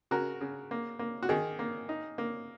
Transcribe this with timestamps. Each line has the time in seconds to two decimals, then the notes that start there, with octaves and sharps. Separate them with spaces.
0.11 C#3 F#4 A#4
0.41 C#3
0.71 A#3
0.99 A#3
1.23 F#4
1.29 D#3 G#4
1.59 A#3
1.89 D#4
2.18 A#3